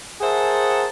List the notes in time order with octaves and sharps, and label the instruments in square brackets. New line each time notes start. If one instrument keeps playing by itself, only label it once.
[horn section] G#4 A#4 C5 E5 F#5 A5